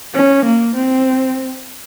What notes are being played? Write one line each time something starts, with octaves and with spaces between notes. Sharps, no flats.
C#4
A#3
C4